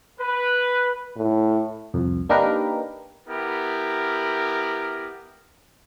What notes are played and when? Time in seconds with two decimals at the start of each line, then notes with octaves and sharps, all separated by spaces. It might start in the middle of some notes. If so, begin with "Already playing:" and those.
0.21 B4
1.16 A2
1.94 C2 F2
2.29 A#3 D4 D#4 G4 A#4 B4
3.28 B3 E4 G4 A#4